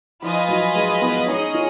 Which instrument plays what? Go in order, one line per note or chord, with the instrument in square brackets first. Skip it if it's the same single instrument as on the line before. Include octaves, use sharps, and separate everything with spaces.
[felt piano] F3 [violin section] F4 B4 D#5 G#5
[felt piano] F#3
G#3
B3
[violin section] C#4 G#4 D#5 [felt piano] D#4
[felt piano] F4